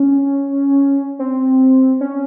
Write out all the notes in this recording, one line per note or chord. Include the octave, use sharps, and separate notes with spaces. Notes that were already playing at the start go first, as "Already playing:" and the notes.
Already playing: C#4
C4
C#4